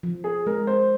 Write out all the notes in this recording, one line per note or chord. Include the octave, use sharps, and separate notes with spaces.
F3
G#4
G#3 A#4
C5